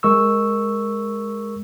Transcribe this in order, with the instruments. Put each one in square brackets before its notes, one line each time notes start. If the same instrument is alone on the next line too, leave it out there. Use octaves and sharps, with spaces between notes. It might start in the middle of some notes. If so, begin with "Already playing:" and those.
[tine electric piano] G#3 A#4 C#6 E6